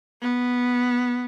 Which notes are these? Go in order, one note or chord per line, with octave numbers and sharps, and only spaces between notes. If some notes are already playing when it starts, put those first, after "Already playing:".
B3